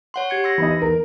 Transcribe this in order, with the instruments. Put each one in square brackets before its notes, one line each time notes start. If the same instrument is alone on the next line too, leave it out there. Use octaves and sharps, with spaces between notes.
[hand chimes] C#5 F#5 C6
G4 G#6 C#7
C6 E6 A#6
[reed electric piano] E3 B3 D#4 [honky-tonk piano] D#5 B5
[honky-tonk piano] A#4